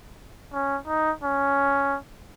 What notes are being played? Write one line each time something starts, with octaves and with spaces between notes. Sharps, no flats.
C#4
D#4
C#4